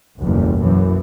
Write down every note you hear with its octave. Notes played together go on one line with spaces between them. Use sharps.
F#1 B1 E2 G2
F#2 E3